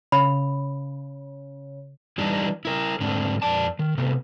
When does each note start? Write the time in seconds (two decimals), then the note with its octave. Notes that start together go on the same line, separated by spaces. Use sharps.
0.12 C#3 B5
2.18 E3 G3 D4 D#4
2.65 E4 A#4
3.01 G#2 D3 A3 C4 D4
3.42 F2 D5 A5
3.79 D#3
3.98 C3 A3 B3